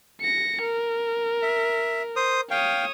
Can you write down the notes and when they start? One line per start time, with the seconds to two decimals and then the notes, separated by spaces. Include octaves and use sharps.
0.21 A#6 C#7
0.62 A#4
1.42 E5
2.16 C5 D#6
2.51 C#5 F5 G5 D#6